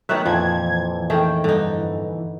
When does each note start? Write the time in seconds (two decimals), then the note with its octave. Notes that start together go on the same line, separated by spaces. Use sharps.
0.09 D#3 F#3 A3 B3 C#5 E5 F#6
0.26 F2 A#2 E3 F3 G#6
1.10 D#3 A3 G#4 G5
1.44 G2 D3 D#4